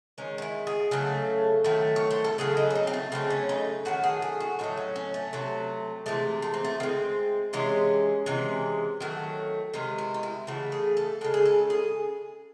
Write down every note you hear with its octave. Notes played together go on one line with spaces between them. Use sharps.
D#3 G#3 C#4
D#4
E4
G#4
C#3 F#3 A3 A4
D#3 F#3 A3
C#5
C5
A4
C#3 F#3 A3 G#4
D#4
C#4
D#4
C4
A3
C#3 F#3 A3 C4
C#4
D#4
D#3 F#3 A3 F#4
G#4
G#4
F#4
A2 F#3 A3 D#4
C#4
C#4
A3
C3 F#3 A3
C3 E3 G#3 A3
A3
C4
A3
D#3 G#3 C4
C3 E3 G#3 C#4
C3 E3 G#3
D#3 F#3 A3
C3 D#3 G#3 D#4
E4
D#4
E4
C#3 E3 A3 F#4
G#4
A4
C#3 G#3 A4
G#4
A4
G#4